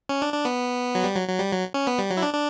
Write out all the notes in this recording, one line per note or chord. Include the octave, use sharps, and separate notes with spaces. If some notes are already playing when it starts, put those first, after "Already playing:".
C#4
D4
D4
B3
F#3
G3
F#3
F#3
G3
F#3
C#4
B3
G3
F#3
E4
D4
D4